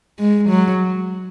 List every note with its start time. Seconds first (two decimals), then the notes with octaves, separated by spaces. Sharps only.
0.19 G#3
0.49 F#3